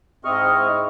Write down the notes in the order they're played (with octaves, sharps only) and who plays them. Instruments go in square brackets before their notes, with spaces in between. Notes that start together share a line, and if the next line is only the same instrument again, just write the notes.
[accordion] G#2 C4 E4 D#5 C#6 F6